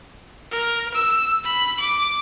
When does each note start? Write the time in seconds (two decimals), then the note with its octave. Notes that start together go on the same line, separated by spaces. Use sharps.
0.52 A#4
0.95 E6
1.44 B5
1.80 D6